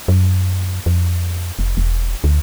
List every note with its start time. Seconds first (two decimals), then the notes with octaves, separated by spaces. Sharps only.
0.08 F#2
0.86 F2
1.59 F1
1.77 E1
2.24 D2